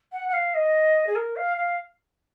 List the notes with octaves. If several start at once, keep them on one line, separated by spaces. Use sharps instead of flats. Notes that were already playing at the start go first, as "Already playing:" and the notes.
F#5
F#5
F5
D#5
G#4
A#4
F5
F5